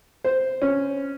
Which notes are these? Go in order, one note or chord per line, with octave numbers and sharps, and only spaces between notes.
C5
C#4